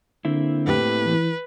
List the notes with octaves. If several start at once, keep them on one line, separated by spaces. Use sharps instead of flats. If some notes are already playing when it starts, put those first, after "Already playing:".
D3 A#3 C4 E4
A2 G4 B4
E3